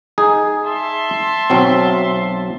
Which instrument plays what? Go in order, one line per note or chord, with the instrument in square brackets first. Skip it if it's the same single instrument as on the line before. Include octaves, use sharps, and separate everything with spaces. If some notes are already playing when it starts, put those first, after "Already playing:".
[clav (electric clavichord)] D#4 G#4
[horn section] E5 A5 C6
[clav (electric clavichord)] B1 F#3 C4